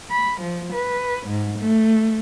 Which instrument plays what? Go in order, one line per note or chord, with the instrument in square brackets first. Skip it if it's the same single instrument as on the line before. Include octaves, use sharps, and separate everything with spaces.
[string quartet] B5
F3
B4
G#2
A3